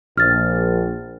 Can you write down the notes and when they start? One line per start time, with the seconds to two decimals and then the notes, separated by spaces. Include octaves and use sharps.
0.18 A#1 F6 A6